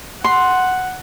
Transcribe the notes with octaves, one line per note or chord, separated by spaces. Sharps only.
F#5 C6